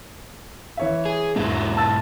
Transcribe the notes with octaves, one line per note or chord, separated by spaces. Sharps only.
E3 C#5 E5
G#4
E1 G#2 B2 E4
A5 E6 A6